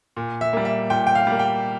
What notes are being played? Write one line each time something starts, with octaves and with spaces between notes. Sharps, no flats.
A#2
E5
G3 A#3
E5
A#2 G5
G5
F5
G3 A#3
G5